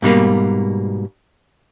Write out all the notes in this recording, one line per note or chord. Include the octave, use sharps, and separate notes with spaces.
G#2 B2 G3 A#3